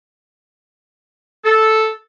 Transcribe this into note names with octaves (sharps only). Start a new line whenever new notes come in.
A4